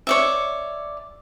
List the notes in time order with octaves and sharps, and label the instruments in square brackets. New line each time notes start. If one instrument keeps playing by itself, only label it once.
[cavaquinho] C#5 D5 E5